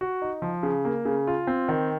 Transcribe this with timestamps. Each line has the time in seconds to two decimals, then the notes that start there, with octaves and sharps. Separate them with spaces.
0.01 F#4
0.22 D#4
0.42 F3
0.63 C#3
0.85 A#3
1.05 C#3
1.27 F4
1.47 C4
1.68 D#3